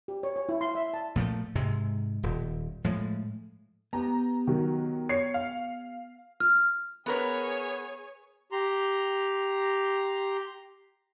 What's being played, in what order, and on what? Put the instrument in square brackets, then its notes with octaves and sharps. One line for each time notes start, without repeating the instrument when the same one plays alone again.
[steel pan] G4
C#5
C#5
E4
C6
E5
A5
[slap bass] A#2 F3 G3 A3
G#2 C3 G#3
D#1
A2 F3 G#3
[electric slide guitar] B3 G4 [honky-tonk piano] A#5
[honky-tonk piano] D#3 F#3
C#5 C7 C#7
F5
[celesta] F6
[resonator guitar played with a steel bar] B3 A#4 B4 [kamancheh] G#4 C#5
[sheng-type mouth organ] G4 A#5 C6